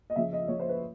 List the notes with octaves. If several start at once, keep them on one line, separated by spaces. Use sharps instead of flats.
D#5
C#3 F3 E5
D#5
C#3 F3 C#5
C5
B4